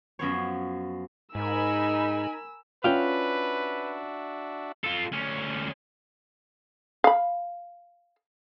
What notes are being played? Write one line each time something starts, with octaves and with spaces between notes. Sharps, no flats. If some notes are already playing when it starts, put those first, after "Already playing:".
F#2 F3 B3 C#4 C5 C#5
G#2 D#4 A#4 G#5 B5 E6
C#4 D4 F4 F#4 B4 E5 F5 G5
F4 A4
D2 C#4
F5 B5